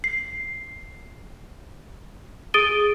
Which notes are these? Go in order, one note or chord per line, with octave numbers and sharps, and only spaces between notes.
C7
G#4 D#6 A6 D7 D#7 G7